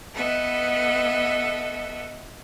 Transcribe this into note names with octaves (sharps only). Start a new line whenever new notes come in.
B3 A4 B4 D#5 E5